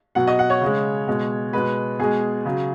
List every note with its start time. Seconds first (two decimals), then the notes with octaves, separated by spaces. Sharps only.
0.15 B2 F#3 F#5
0.27 D#5
0.39 F#5
0.50 C#5
0.61 C#3 G#3
1.08 B2 G#3
1.53 B2 G#3 B4
1.99 B2 G#3 G#4
2.45 C#3 F#3